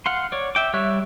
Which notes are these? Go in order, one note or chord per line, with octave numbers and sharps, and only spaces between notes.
F5 F#5 C6
C#5 D5
E5 G5 D6
G3 C#5 E5 C#6 F#6